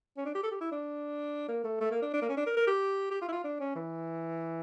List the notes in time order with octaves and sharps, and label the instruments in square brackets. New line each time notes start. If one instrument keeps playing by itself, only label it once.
[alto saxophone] C#4
D4
G4
A4
G4
E4
D4
A#3
A3
A3
A#3
D4
D4
A#3
C#4
D4
A#4
A#4
G4
G4
F4
E4
F4
D4
C#4
E3